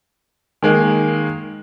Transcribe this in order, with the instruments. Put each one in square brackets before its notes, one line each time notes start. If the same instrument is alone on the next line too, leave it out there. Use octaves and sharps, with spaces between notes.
[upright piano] D#3 G#3 A#3